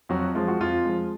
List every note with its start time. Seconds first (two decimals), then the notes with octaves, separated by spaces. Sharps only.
0.09 F2 F#3 F#4
0.35 F3 G#3 F4
0.48 F#4
0.60 F2 F4
0.85 F3 G#3